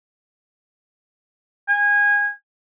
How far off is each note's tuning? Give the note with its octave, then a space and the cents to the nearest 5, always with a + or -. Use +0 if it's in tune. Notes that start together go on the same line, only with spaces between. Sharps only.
G#5 -20